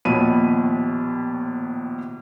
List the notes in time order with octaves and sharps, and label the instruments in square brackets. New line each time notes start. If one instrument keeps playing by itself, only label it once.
[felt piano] A#1 D#2 B2 C#5 B5 D#7